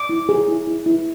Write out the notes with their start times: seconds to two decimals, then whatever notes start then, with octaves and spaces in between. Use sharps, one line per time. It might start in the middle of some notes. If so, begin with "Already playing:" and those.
Already playing: D6
0.09 E4
0.29 G#4
0.48 E4
0.67 E4
0.86 E4